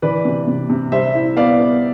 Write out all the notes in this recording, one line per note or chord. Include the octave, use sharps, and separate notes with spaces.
E3 B4 D5
C3
C3
C3
G3 C5 E5
E4
B3 D5 F5
B3